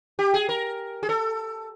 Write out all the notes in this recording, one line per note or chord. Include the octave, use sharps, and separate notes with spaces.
G4
G#4
A#4
G#4
A4